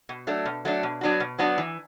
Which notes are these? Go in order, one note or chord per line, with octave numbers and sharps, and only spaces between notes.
B2
F#3 A3 D4
B2
F#3 A3 D4
B2
F#3 B3 D4 F#4
B2
F#3 B3 D4 F#4
E3